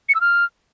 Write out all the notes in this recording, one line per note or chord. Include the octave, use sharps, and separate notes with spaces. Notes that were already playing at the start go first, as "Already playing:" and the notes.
C#7
E6
F6